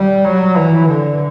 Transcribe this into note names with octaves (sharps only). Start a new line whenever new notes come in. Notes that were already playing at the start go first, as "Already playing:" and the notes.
Already playing: G3
F#3
E3
D3